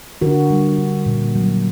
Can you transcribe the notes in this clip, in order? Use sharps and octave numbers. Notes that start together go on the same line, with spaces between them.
D3 F#4 A#4
G3
D3
A#2
F#3